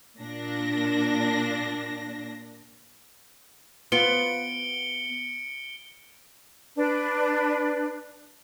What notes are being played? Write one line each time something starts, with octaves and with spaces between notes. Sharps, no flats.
A#2 D4 A#6
B3 F4 C#7 D7 G7
D4 B4